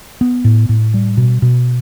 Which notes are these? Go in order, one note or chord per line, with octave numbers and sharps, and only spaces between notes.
B3
A2
A2
G3
B2
B2